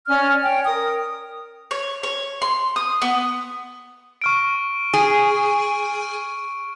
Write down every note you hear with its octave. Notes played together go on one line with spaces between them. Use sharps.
C#4 D5 F6
C#5 G5
A#4 D#6
C#5
C#5
C6
D#6
B3
C#6 F6 D7
G#4 D#7